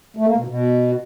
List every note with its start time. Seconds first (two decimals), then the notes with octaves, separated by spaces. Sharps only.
0.17 A3
0.27 A#3
0.37 B2
0.47 B2